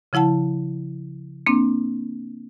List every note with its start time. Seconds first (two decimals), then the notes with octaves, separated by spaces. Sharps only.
0.13 C#3 F3 E4 F#5 A5
1.46 A#3 C4 D4